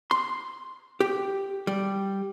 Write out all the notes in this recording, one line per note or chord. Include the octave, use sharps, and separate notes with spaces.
C6
G4
G3